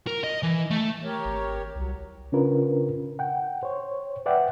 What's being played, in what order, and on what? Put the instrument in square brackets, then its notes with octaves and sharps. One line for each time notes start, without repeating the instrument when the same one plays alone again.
[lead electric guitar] A#4
D#5
E3
A3
[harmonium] G4 A#4 C#5
[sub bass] G#1
[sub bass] C2 [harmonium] F#3
[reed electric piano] C#3 C#4 D4 F4 A#4 B4
F#5 G5
C5 C#5
B4 D5 E5 F#5 G5